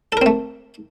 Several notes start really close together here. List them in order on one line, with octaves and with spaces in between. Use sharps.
A4 A#4 C4 A3